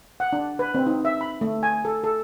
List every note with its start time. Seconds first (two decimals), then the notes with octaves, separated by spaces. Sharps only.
0.20 F#5
0.33 D4
0.59 B4
0.75 C4
0.87 D#4
1.05 E5
1.21 B5
1.41 A3
1.63 G#5
1.85 A4
2.04 A4